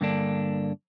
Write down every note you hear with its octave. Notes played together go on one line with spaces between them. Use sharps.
G2 D3 A#3 D4